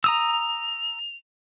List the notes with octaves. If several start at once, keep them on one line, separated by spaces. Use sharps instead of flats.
A#5 D#6 E6 F7